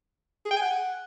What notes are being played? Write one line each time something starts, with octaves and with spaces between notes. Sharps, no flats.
G#4
G5
G#5
F#5